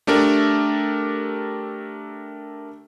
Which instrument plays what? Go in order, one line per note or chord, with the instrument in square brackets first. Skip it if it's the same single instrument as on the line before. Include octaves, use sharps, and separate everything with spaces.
[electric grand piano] A3 D4 G4 A4 A#4